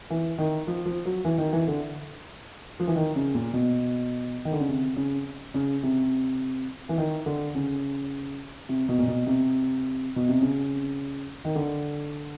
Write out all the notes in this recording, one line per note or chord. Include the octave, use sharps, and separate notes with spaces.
E3
D#3
F3
F3
F#3
E3
D#3
E3
D3
F3
E3
D#3
C#3
A#2
B2
D#3
D3
C#3
C3
C#3
C#3
C3
E3
D#3
D3
C#3
C3
B2
A#2
B2
C3
B2
C3
C#3
D#3
D3